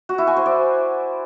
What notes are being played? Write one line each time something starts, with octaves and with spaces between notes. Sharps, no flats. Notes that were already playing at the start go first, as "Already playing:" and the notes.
F#4
E4
G#5
C5
D5